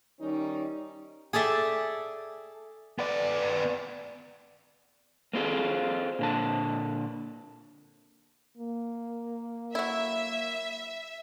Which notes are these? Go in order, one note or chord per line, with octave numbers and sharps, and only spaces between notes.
D#3 G3 C#4 D#4
G#4 A4 D5 E5 G5
B3 D5
A#3 C4 F4 G#4 A4
A#2 D3 A5
A#3
F#3 E4 E5